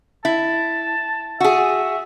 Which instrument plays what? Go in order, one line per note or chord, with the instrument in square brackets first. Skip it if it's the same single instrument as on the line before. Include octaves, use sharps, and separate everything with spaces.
[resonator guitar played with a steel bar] E4 [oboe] A5
[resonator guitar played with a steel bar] F#4 G#4 [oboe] E5